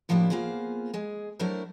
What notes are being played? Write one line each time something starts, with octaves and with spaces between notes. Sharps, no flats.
A2 F3 A#3 D4 E4 G4
A#3 B3 F4 G#4 C5
G#3 G#4
F#3 A3 D4 E4 A#4 C5